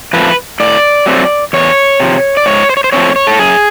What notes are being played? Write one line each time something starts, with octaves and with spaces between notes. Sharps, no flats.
F3 A3 C4 B4
A2 D5
F#3 A3 C4
E2 C#5
C3 F3
D5
G#2 C#5
C5
C#5
C5
F3 A3 C4 C#5
C#5
A4
F#2 G#4